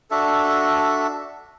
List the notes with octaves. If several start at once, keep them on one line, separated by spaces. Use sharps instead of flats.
D4 F#4 A4 E5